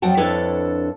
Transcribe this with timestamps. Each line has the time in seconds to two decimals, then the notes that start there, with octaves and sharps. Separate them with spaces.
0.02 F2 F#3 F#5 G5 A5
0.17 F2 D4 E4 A4 B4 C#5